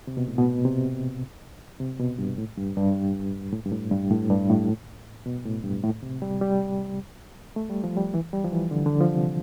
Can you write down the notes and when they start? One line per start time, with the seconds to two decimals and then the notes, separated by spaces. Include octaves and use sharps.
0.07 C3
0.17 B2
0.28 A2
0.38 B2
0.65 C3
1.80 C3
1.99 B2
2.18 G2
2.38 A2
2.57 G2
2.76 G2
3.53 A2
3.66 G2
3.72 A2
3.91 G2
4.10 A2
4.29 G2
4.49 A2
5.26 B2
5.45 A2
5.64 G2
5.83 A2
6.03 C3
6.22 G3
6.41 G3
7.56 A3
7.70 G3
7.84 F3
7.97 G3
8.14 E3
8.33 G3
8.44 F3
8.52 E3
8.71 D3
8.86 D3
9.00 F3
9.14 C3